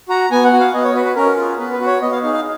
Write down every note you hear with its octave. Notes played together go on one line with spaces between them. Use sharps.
F#4 A#5
B3 G#5
F#5
F#4
F5
B3 D#5
C#5
F#4 B4
B4
C#4 A#4
F4 G#4
B3 B4
B4
F#4
C#5
B3 D#5
F5
D#4 G#4 F5
F5